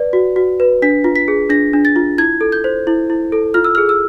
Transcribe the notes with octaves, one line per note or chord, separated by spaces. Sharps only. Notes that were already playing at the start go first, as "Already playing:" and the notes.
Already playing: B4 D5
F#4
F#4
B4
D4 B6
F4
B6
G#4
D4 A#6
D4
A6
F4
E4 G#6
A4
G6
C5
E4
E4
A4
F4 F6
E6
F6
G#4
E6